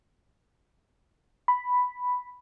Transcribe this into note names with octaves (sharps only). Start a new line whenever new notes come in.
B5